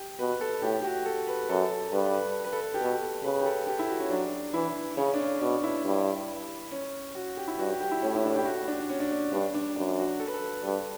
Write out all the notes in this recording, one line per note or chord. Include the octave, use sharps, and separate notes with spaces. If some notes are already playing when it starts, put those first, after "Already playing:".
Already playing: G4
B2 B4
A4
A2 G4
G4
F#4
A4
B4
F#2 A4
G2 B4
B4
B4
A4
B4
G4
B2 A4
C#3 B4
G4
A4
G4
E4
F#4
C#4
F#3 D4
E3 E4
C#3 C#4
D4
C#4
B2 D4
E4
G2
C#4
F#4
G4
E4
G2 F#4
G4
G4
E4
A2 C#4
E4
D4
G4
F#4
D4
D4
C#4
D4
D4
G2 D4
D4
F#2 D4
F#4
A4
B4
A4
G2